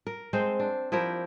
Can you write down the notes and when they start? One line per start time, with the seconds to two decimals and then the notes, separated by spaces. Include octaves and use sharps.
0.07 A#4
0.33 G#3 C4 A4 C5
0.60 D4
0.92 F3 E4 G4 A#4